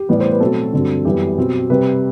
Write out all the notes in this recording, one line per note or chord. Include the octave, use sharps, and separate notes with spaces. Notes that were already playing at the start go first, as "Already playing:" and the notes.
Already playing: G4
A2 E3 G3 B3 D5
C5
B4
B2 F#3 A3 C4 A4
G2 D3 F#3 C4
F#2 E3 G3 B3 G4
B2 F#3 C4
C3 G3 C4 B4